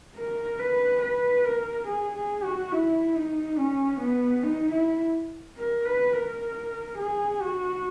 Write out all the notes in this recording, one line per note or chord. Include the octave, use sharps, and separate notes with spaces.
A#4
B4
B4
A#4
G#4
G#4
F#4
E4
D#4
C#4
B3
D#4
E4
A#4
B4
A#4
G#4
F#4